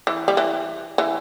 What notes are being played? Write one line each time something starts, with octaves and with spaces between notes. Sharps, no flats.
E3
G3
E3
E3